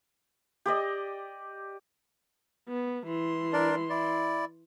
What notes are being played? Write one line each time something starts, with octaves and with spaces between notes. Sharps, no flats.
G4 D5 D#5
B3
E3 C6
D4 A#4 D5
E4 D5